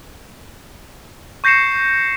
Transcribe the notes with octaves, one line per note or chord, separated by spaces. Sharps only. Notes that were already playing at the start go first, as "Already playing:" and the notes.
C#6 G6 A#6 C7 C#7 E7